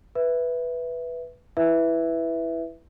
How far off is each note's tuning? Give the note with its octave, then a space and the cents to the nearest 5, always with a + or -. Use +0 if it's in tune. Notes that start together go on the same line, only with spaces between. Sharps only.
B4 +0 E5 +0
E4 +0 B4 +0 E5 +0